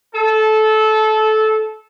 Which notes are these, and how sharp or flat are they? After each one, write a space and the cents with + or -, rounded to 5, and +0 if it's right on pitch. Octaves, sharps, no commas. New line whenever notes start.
A4 -20